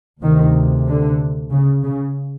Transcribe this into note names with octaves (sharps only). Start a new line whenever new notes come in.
D2 C3 D#3
D3
C#3
C#3